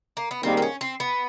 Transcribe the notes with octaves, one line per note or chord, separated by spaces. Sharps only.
A#3
B3
G#2 D#3 G3 A#3 C4
C4
C#4
C4
B3